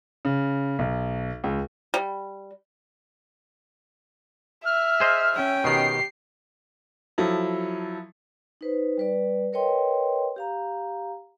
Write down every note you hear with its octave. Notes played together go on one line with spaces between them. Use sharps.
C#3
B1
C#2
G3
E5 F6
G#4 C5 D#5
C#4 G5
B2 D#3 G4 C7
F3 F#3 E4 A4
D#4 B4 C5
G3 B4 D5
A#4 B4 C#5 D#5 G5 C6
G4 F5 A#5